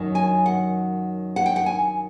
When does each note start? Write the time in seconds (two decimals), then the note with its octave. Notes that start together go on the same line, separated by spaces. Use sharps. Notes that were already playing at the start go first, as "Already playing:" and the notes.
Already playing: F#2 D#3 F#3
0.15 G#5
0.46 F#5
1.36 F#5
1.46 G5
1.56 F#5
1.66 G#5